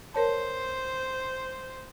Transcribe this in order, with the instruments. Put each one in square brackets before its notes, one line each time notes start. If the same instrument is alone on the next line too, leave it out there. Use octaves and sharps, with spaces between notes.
[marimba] A#4 C#5 A5 [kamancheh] C5